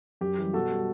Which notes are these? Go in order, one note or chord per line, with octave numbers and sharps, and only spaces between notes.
F#2 G4
E3 G3
B2 F#4 A4
G3